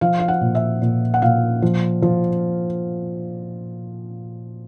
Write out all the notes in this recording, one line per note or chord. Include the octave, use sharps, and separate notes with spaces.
F3 F5
F5
F#5
A#2
E5
A#2
F#5
A#2 F5
F3
F3